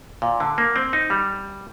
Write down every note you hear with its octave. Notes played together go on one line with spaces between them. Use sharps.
A#2
D3
A#3
C4
D#4
G3